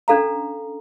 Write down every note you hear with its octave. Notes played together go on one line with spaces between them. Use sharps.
C#4 D4 A4 F5 A#5